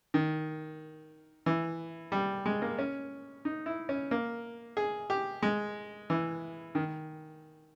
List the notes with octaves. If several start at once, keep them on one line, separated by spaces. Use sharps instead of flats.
D#3
E3
G3
G#3
A#3
C#4
D#4
E4
C#4
A#3
G#4
G4
G#3
E3
D#3